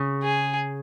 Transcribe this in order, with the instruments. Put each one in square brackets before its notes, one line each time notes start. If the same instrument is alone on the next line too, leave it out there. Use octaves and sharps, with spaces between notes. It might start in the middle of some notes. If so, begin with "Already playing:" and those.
Already playing: [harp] C#3
[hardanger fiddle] G#4